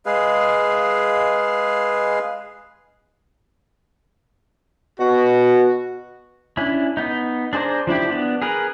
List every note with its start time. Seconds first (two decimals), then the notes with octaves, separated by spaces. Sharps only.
0.06 G#3 G#4 B4 F5
5.00 B2 F#4
6.57 C#4 D4 E4
6.97 B3 D#4
7.53 D4 G#4 C5 D5 A#5
7.87 F3 D4 E4 G4
8.10 B3 D4
8.42 G#4 A#4 B4